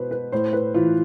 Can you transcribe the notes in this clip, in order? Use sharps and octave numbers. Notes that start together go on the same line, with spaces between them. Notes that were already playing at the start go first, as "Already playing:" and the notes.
Already playing: B2 B4 C5
B4
A2 C5
B4
E3 F4